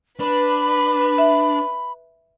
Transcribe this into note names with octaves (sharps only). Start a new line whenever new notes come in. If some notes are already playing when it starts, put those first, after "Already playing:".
D4 B4 B5
E5